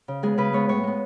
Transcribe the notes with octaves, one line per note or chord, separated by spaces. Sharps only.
C#3
G#3 B3 G#4
C#3 B4
G#3 B3 C#5
A2 C#5
G#3 B3